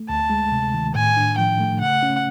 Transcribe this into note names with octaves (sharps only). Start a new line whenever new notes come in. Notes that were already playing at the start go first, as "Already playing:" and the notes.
Already playing: A3
D2 A5
G#3
C3
D#3
A2 G#5
D4
F3 G5
A3
C#3 F#5
C#4